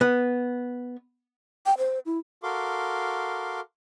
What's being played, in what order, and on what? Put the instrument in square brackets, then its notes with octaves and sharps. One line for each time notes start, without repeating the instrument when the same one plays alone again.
[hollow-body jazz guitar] B3
[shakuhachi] G5
C5
E4
[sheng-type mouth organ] F#4 A4 A#4 F5 C6 D6